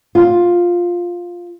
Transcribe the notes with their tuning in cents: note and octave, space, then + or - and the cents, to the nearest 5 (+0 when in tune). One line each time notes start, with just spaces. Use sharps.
F4 +5